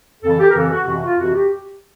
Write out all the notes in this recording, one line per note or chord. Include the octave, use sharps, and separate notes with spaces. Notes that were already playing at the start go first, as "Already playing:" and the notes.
F2 C#3 E3 A4
G4
A#4
F2 C#3 E3 A4
F#4
F2 C3 E3 F#4
F4
F2 C3 E3 F#4
G4